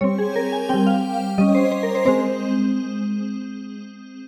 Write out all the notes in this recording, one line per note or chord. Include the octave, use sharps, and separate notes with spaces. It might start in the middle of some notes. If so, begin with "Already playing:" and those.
G3 C4 C#5
G#4
A#4
G#5
G3 C4 G5
F5
G3 C#4 D#5
C5
C5
A#4
C5
G#3 C4 C5